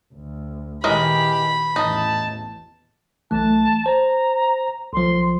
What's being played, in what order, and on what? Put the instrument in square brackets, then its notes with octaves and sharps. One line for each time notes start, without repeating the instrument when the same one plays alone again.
[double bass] D2
[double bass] A#2 D#3 [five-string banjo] E3 G#3 A#4 [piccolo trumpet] G4 [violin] B5
[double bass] A1 E2 [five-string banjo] D#4 [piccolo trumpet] A5
[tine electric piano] B1 E3 A3 [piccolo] A5
[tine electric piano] C5 [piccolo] A#5
[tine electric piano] B1 F3 [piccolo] C6